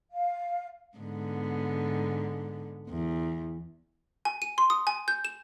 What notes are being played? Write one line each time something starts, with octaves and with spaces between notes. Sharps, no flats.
F5
G#2 D3 B3
E2
G#5
D#7
C6
D#6
G#5
G6
E7